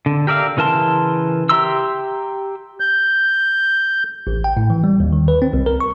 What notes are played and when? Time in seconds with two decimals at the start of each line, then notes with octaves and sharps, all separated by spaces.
0.06 D3
0.27 G4 A#4 D5 E5 F5
0.57 C#3 E3 A#4 A5 C6
1.49 G4 E5 A#5 C6 E6
2.80 G6
4.27 A1
4.44 G5
4.57 A2
4.70 E3
4.84 G3
5.00 D#2
5.13 D#3
5.28 B4
5.42 C4
5.53 C2
5.66 A#4
5.80 C#6